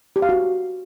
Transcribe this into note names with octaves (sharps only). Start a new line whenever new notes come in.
G4
F5
F#4